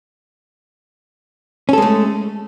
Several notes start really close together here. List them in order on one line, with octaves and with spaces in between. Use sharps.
C#4 A4 G#3 A3